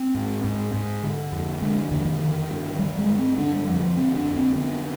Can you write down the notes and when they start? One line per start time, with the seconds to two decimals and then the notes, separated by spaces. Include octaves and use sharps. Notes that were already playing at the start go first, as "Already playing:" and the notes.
Already playing: C4
0.15 G#2
0.44 G#2
0.74 G#2
1.03 D3
1.32 F2
1.62 D3 G#3
1.91 F2 D3
2.05 D#3
2.20 D3 D#3
2.50 G2
2.79 D3 G3
2.98 G#3
3.09 G2
3.18 C4
3.38 D3 D4
3.53 G3
3.67 F2 F3
3.82 F3
3.96 D3 C4
4.16 D4
4.26 F2
4.36 C4
4.55 D3 B3